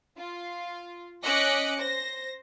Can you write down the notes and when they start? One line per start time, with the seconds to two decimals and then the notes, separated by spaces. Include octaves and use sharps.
0.18 F4
1.23 C#4 D#5 D6 F#6 B6 C#7
1.81 C5 A#6